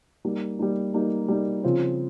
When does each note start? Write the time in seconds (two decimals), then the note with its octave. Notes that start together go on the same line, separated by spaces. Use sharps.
0.25 G3 A#3 D#4
0.59 G3 A#3 D#4
0.94 G3 A#3 D#4
1.28 G3 A#3 D#4
1.64 C#3 F3 C4 F4